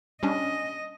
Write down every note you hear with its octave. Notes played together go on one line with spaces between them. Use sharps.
G3 C#4 D4 D#5